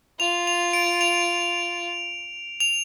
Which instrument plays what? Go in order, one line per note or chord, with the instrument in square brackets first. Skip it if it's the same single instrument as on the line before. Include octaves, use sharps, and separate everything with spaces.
[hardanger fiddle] F4 [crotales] F7
[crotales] F7
D7
F7
F7